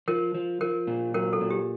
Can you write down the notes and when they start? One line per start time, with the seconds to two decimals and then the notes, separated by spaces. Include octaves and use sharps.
0.08 F3 A#4
0.34 F3
0.61 F3 A#4
0.87 A#2
1.14 F#3 A#4
1.33 A4
1.41 A#2
1.50 G4